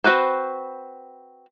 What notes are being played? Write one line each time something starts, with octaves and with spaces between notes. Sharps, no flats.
C4 F#4 B4 C5